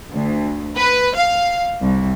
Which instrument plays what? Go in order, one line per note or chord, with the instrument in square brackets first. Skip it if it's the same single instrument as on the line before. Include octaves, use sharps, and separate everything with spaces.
[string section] D2
B4
F5
C2